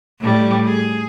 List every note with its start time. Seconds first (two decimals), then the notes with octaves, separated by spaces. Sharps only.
0.20 A2 G3
0.66 G#4